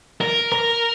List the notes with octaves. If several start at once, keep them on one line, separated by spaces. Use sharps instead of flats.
A#4
A#4